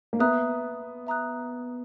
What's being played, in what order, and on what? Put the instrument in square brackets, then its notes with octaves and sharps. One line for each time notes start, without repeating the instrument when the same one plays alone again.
[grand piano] A#3
[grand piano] B3 [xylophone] E5 A#5 D#6 F#6
[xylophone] E5 A#5 D#6 F#6